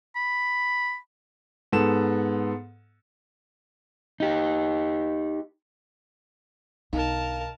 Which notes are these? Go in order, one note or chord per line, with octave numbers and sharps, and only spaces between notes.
B5
G#2 B3 A4 E7
D#4 G4
B1 D3 D#4 A#4 F5 A5